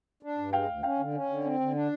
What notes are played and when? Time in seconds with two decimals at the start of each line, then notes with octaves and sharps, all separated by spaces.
0.23 D4
0.38 G2
0.53 G#3 F5 G5
0.68 D2
0.83 C#4 F5 G5
0.99 D3
1.14 C#4
1.29 D3
1.44 C4
1.60 D3
1.75 D4